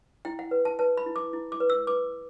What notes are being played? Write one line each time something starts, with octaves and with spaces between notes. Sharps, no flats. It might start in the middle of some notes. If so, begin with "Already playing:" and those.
E4 G5
F#5
B4
A5
B4 A5
B5
E4
D6
E4
D6
B4
E6
B4 D6